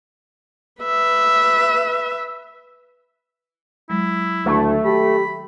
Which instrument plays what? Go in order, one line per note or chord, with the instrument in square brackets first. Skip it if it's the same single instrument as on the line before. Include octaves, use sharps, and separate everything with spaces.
[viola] B4 E5
[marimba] F#3 G#3 [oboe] E4
[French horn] D2 [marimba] D#3 G#6 [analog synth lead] A3
[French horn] G4 [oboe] B5